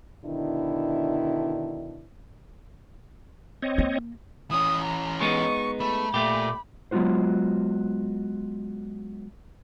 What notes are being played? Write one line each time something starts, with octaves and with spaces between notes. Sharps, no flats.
B2 D3 D#3 D4 E4
C4 C#5 D#5
A#3
E3 C#4 D#6
A#5
G#3 B3 D#4 C#6
A3 B5
A#2 A3 G4
F#3 G#3 B3 F4 F#4 C5